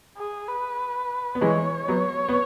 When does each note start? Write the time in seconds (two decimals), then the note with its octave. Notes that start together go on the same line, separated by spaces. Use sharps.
0.17 G#4
0.48 B4
1.35 B3
1.41 E3 G#3 C#5
1.88 F#3 B3
2.29 B3